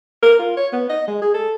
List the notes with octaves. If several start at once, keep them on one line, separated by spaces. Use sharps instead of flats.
A#4
F4
C#5
B3
D#5
G#3
G#4
A4